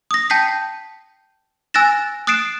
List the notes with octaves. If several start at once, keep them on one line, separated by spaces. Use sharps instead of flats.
D#6 A#6
G5 A5 G6 B6 C7
G#5 E6 F#6 A6 A#6 E7
D#6 F#6 A6 C7 D7 E7